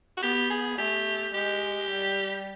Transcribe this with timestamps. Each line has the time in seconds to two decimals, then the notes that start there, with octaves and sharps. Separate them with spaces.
0.17 F#4
0.22 B3 G4
0.50 G#4
0.78 A3 G4
1.34 G#3 G4
1.90 G3